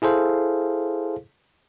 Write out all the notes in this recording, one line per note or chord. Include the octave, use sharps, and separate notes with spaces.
E4 G#4 A4 C5 F5